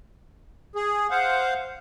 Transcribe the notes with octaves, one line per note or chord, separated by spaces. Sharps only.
G#4
C5 F5 F#5